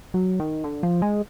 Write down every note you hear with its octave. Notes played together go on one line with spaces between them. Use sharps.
F#3
D#3
D3
F3
G#3